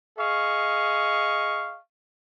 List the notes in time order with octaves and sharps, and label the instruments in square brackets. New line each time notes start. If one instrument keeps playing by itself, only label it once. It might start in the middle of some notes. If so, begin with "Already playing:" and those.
[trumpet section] G#4 D#5 F5 C#6